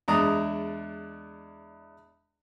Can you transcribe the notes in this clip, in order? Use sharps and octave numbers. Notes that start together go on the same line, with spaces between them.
E2 G#3 D4 A#5 D#6